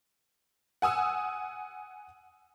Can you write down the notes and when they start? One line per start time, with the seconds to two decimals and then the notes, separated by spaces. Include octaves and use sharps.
0.82 F#5 G#5 D#6 E6